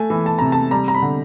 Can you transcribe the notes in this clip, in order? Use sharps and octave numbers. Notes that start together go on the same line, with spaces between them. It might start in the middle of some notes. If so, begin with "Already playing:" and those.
Already playing: A3 G#5
E3
A5
C3 A#5
A5
G3 A#5
A#5
B5
D3